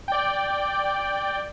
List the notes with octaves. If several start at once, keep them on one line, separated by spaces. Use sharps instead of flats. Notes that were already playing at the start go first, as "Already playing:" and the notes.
D5 G5